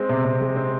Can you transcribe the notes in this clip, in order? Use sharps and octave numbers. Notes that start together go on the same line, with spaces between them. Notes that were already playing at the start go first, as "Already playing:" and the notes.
Already playing: G#3 C4
C3
C3
G#3
C4